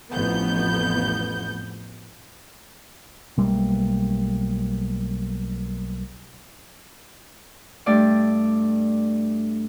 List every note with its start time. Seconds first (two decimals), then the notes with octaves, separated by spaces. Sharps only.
0.12 A1 F2 B3 G6
3.37 B1 G3 A3 A#3
7.86 G2 A3 D4 D5